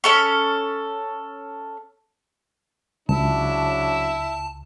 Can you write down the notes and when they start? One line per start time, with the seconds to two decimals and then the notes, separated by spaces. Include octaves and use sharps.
0.04 C#4 A4 C#6
3.09 C#2 C#3 F#3 D4 E4 A5